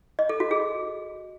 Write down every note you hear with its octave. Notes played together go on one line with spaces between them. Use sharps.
D#5
A4
F#4
G#4